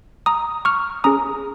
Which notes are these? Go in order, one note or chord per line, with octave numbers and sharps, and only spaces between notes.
A#5 D#6
C#6 F6
C#4 G#4 A#5 D#6